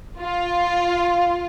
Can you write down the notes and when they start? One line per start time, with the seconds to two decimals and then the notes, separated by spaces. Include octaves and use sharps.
0.20 F4